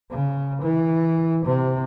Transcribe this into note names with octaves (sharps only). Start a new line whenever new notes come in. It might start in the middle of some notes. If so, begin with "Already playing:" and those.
C#3
E3
C3